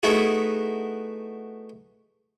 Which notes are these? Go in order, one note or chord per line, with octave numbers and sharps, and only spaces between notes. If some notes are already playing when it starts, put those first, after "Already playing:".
A3 B3 D#4 E4 F#4 G#4